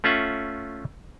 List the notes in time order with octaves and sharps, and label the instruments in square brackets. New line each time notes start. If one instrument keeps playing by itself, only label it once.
[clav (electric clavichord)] A3 C#4 F4 E5 F#5